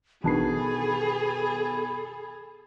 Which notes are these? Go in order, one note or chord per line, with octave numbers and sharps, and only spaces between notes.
A1 B2 D#3 D4 G#4 A4 B5 C7